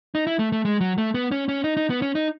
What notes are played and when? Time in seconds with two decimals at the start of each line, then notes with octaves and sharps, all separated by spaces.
0.15 D#4
0.27 E4
0.39 A3
0.52 A3
0.65 G#3
0.81 F#3
0.98 A3
1.14 B3
1.32 C#4
1.49 C#4
1.64 D#4
1.77 D#4
1.90 B3
2.02 C#4
2.15 D#4